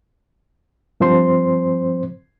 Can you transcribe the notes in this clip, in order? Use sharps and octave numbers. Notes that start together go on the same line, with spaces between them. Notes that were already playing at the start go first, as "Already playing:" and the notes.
G2 F3 C4 C5 C6